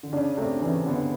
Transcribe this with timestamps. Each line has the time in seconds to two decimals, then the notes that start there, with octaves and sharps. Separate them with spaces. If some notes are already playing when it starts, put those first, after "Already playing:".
0.03 D3
0.13 C#3 D4
0.38 C3 A3
0.62 C#3 E3
0.86 D3 B3